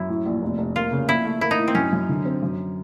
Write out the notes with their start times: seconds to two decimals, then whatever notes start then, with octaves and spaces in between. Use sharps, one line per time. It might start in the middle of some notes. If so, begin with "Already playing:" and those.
Already playing: F#2 E4
0.08 A2
0.26 A#1
0.42 F1
0.58 F1
0.76 A#3 F4
0.92 C#3
1.08 A#1 E4
1.25 A3
1.41 A#3 E4
1.51 D#4
1.58 A2
1.68 C4
1.75 F#2 C#4
1.93 F#2
2.09 D3
2.25 C4
2.43 F#2